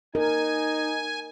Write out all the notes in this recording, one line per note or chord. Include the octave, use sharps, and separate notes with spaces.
D#4 A#4 G#5